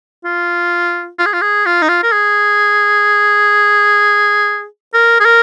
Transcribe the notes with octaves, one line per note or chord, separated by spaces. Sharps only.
F4
F4
G#4
F4
G#4
F4
D#4
F4
A#4
G#4
A#4
G#4
A#4